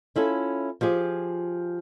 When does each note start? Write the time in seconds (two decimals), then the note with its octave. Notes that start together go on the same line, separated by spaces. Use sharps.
0.16 C#4 E4 F4 A4
0.81 F3 F4 G4 G#4